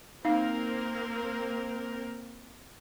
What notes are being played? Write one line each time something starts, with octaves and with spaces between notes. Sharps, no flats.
A#3 C4 D#4 A#4 F5